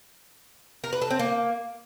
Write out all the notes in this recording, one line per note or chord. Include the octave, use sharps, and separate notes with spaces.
A#4
B4
A4
C4
A#3